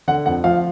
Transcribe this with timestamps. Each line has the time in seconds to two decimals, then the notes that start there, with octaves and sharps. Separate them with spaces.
0.08 D3 F#5
0.26 F2 F#5
0.44 F3 F5